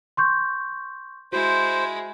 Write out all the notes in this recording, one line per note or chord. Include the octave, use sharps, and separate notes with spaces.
C6 C#6 G6
G#3 E4 F#4 C5